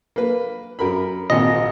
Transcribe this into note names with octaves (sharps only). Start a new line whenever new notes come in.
A#3 B4
F#2 A#4 B5
G#1 A#2 D#5